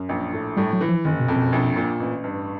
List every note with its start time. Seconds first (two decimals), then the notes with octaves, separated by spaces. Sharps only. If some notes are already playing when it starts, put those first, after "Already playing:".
Already playing: F#2
0.09 A#1
0.33 A2
0.57 A2 G3
0.73 F#3
0.81 E3
0.89 F3
1.05 F#1 D#3
1.20 B2
1.28 F2
1.36 B2
1.52 A#1
1.76 A#2
2.00 A1
2.24 G2